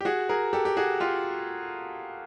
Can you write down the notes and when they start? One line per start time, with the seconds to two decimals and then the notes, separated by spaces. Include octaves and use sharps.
0.01 G4
0.05 F#4 G#4
0.29 G#4 A#4
0.53 G4 A4
0.65 G4
0.77 F#4 G#4
1.00 F4 G4